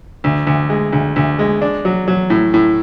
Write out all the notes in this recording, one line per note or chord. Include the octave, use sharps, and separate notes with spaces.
D2
D2
G#3
D2
D2
G#3
D4
F#3
F#3
A2
A2